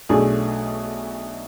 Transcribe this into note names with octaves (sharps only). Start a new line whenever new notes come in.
B1 B2 A3 D4 G#4